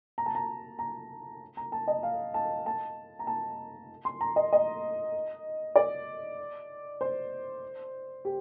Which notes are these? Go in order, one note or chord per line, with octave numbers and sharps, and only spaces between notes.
A#5
A5
A#5
A#5
A#5
A5
D#5
F5
A5
A5
A#5
A5
C6
A#5
D#5
D#5
D5
C5
G4